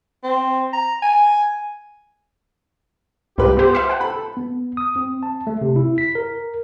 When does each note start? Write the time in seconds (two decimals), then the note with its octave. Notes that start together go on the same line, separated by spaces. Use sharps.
0.24 C4
0.73 A#5
1.03 G#5
3.38 C2 G#2 F4 G4 B4
3.57 B3 G4 C5
3.73 G4 E5 F5
3.90 F#5 G5
4.01 A4 B5
4.37 B3
4.77 D#6
4.96 C4
5.23 A5
5.47 A3
5.61 C3
5.76 E4
5.98 B6
6.15 A#4